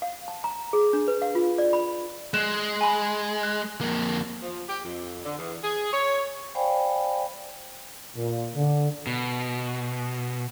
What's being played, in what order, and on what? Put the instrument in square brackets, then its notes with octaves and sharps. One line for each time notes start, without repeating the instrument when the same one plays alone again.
[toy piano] F5
A5
A#5
G#4
D4
B4
F5
F4
D5
B5
[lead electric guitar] G#3 [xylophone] F#6 E7
[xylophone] G#5 B5
F#6
[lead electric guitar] F2 A#3
[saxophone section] F3
G4
F2
D3
E2
G#4
C#5
[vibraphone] C5 D5 F5 G5 G#5 B5
[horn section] A#2
D3
[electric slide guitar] B2